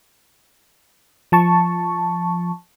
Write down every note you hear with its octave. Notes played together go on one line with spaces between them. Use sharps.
F3 A5 C#6